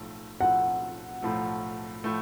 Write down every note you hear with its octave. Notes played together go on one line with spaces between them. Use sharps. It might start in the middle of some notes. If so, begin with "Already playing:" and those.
Already playing: B1 A2 F3 A3
B1 A2 F3 A3 F#5
B1 A2 F3 A3
A2 F3 A3